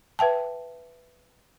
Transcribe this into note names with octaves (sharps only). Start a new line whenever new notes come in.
B4 E5 G5 A5